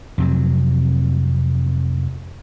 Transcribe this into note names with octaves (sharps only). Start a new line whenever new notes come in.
F2 C3 F#3